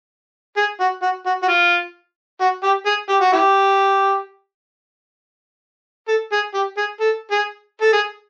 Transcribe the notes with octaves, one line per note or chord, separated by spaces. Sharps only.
G#4
F#4
F#4
F#4
F#4
F4
F#4
G4
G#4
G4
F#4
E4 G4
A4
G#4
G4
G#4
A4
G#4
A4
G#4